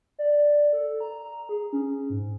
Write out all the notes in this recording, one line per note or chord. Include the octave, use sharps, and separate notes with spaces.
D5
A4
A#5
G#4
C#4
G#2